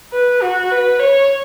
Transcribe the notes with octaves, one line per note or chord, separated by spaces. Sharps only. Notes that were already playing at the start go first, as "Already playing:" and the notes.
B4
F#4
B4
C#5